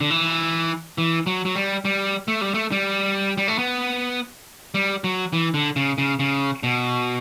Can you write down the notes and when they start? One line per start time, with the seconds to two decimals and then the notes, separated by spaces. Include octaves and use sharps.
0.01 D3
0.10 E3
0.98 E3
1.26 F#3
1.45 F#3
1.56 G3
1.85 G3
2.28 A3
2.41 G3
2.54 A3
2.72 G3
3.38 G3
3.48 A3
3.59 B3
4.74 G3
5.04 F#3
5.33 E3
5.54 D3
5.76 C#3
5.98 C#3
6.19 C#3
6.63 B2